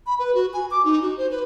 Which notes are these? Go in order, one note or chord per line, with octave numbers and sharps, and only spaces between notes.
B5
B4
F#4
G#5
D6
D#4
F#4
C5
B4